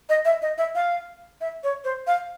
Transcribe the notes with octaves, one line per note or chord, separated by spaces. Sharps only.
D#5
E5
D#5
E5
F5
E5
C#5
C5
F5